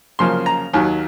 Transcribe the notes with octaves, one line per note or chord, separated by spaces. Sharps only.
F#2 C#3 F3 A#3 C#4 C6
A#5
D#2 D#3 F#3 G#5